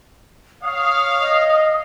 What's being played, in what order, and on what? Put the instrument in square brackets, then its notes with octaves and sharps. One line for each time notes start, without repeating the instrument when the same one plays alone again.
[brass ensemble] C#5 F5 [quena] D#6
[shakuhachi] D#5